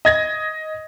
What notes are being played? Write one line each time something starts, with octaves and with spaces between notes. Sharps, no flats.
D#5 G#6 A#6